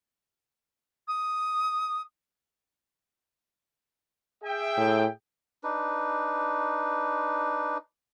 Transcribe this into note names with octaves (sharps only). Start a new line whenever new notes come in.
D#6
G#4 E5 G5
A2
D4 D#4 B4